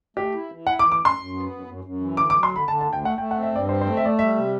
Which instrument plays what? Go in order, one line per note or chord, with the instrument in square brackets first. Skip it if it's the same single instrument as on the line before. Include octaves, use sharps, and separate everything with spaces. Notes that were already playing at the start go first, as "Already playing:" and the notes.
[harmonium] A3 [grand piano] G4
[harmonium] E4
E3
[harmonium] E4 [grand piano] F#5
[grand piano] D6
[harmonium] E3
[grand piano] D6
[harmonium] F#2 [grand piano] C6
[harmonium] F#2
B3
F#2
F#2
F#2
E3
[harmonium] D3 [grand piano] D6
[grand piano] D6
[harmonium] F#3
[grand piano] C6
[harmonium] D3
[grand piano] B5
[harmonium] D3 [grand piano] A5
[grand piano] A5
[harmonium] D2
[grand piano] G5
[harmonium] A3 [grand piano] F#5
[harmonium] A3 [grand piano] G5
[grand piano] F#5
[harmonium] C4
[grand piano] E5
[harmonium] G2 [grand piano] D5
[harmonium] C4 [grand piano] C5
[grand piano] C5
[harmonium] A3
[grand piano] E5
[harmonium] A3 [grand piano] D5
[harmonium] G3 [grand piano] E5
[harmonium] C3